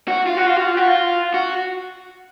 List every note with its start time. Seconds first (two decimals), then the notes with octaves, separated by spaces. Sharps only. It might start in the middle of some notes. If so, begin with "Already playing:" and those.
0.08 F#4
0.27 F4
0.37 F#4
0.47 F4
0.57 F#4
0.66 F4
0.77 F#4
0.87 F4
1.34 F#4